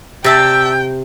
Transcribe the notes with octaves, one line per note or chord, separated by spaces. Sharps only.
C3 D5 E5 G5 A5